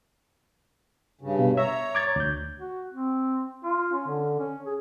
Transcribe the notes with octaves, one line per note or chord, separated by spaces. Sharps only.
G2 C#3
B2
C#5 E5 A#5
D6 G#6 A6
D2 G6
F#4
C4
F4
C#4
D3
C#4
G#4